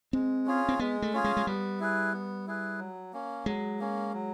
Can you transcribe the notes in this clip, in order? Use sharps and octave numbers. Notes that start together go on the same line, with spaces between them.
G#3 C4
C#4 F4 G#4
C4
G#3 B3
A3
C#4 F4 G#4
G#3
G#3
G3 B3
E4 G#4 B4
B3
E4 G#4 B4
F#3
A#3 C#4
F#3 G#3
A#3 C#4
F#3